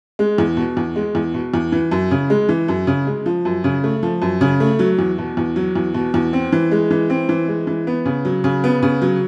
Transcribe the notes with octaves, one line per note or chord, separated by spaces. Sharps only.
G#3
E2
B2
E2
G#3
E2
B2
E2
E3
F#2
C#3
G#3
E3
F#2
C#3
G#3
F3
F#2
C#3
A3
F3
F#2
C#3
A3
F#3
E2
B2
E2
F#3
E2
B2
E2
C4
E3
G#3
E3
C4
E3
G#3
E3
B3
C#3
F#3
C#3
B3
C#3
F#3